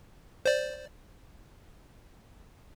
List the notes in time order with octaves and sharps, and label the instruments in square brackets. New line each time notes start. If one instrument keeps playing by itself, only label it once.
[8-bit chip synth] C5 D5